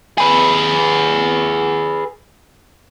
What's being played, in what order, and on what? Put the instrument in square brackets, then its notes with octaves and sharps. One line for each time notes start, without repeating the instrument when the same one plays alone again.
[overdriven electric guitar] G#4 B4